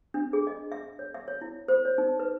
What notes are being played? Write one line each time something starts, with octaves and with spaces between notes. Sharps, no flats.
D4
G#4
D#5
E5
C#5
E5
C#5
E4
C5
C#5
D#4
B4